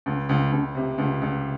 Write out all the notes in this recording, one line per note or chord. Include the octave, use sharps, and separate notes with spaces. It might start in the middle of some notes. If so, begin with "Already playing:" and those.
C#2
C#2
C#2
C3
C#2
C#2